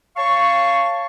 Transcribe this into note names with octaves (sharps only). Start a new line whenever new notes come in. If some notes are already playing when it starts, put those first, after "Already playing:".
C#5 F5 A5 C#6